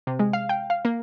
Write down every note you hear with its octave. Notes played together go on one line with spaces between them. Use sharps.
C3
G#3
F5
G5
F5
A#3